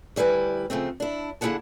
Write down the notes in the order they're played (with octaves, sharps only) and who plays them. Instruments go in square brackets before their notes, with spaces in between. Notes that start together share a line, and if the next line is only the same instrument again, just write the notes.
[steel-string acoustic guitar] D2 G3 E4 B4 G#5
C#3 F3 A3 C4
D4 E4
D3 A#3 E4 G#4 F#5 A5